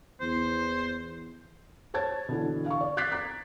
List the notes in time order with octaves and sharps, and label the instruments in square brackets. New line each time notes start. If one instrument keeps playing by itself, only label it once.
[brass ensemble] E2 [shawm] C5
[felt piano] C5 C#5 A5 G#6 A6
B2 D3 E3
F5 C#6
D5
D6 F#6 G#6 A6 B6 C7
A#5 D6 F#6